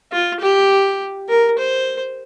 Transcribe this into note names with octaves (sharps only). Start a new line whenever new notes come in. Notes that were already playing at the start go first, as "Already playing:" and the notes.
F4
G4
A#4
C5